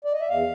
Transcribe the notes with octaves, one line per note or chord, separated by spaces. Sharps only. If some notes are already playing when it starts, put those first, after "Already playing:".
D5
D#5
E5
E2 F5